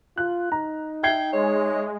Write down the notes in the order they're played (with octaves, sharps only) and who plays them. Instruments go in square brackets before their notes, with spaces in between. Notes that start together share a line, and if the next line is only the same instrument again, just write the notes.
[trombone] F4 [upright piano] F#6
[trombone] D#4 [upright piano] A#5
[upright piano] E5 G#6 C7 [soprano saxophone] G5
[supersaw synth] G#3 [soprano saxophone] C#5